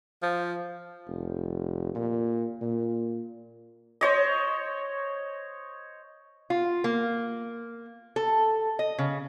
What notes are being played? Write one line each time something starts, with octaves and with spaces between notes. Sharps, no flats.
F3
F1
A#2
A#2
C5 C#5 D#5
F4
A#3
A4
D#5
C#3